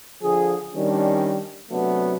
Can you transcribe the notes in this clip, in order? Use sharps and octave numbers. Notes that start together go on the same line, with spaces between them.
D3 F3 G#4
D#3 G3 C#4 D4
C3 F#3 A3 B3 D4